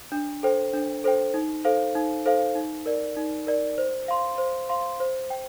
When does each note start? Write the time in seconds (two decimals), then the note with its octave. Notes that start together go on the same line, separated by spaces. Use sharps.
0.12 D4
0.43 A4 C5 G5
0.73 D4
1.04 A4 C5 G5
1.34 D#4
1.65 A4 C5 F5
1.95 D#4
2.25 A4 C5 F5
2.55 D#4
2.86 A#4 D5
3.16 D#4
3.47 A#4 D5
3.78 C5
4.08 F5 C6
4.38 C5
4.69 F5 C6
5.00 C5
5.30 G5